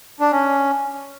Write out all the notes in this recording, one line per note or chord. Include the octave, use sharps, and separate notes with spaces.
D4
C#4